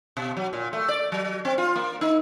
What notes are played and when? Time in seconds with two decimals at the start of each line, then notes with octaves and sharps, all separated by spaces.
0.17 B2
0.37 F#3
0.53 A#2
0.73 A3
0.88 D5
1.12 F#3
1.45 C4
1.58 F4
1.76 A#3
2.01 D#4